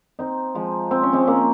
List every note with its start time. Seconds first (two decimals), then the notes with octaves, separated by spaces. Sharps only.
0.19 C4 D#4
0.55 F3 G#3
0.91 C4
1.03 C#4
1.13 G#3 C4
1.27 A#3 C#4